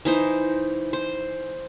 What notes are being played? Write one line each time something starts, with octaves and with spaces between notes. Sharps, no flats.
E3 D#4 C5
C5